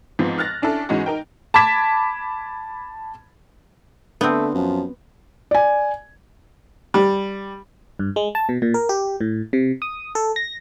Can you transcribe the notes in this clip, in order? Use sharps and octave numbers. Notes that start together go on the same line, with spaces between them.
G#2 F3 B3 C4
F6 F#6 A6 A#6
C#4 D4 E4 A4
G#2 E3 G#3 C#4 D#4 F#4
D#4 A#4 G5
A5 B5 D6 G#6 B6 E7
D3 A3 B3 C4
F#2 F3
D5 G#5
G3
G2
G#3
A5
B2
A#2
A#4
G4
A2
C3
D#6
A4
A#6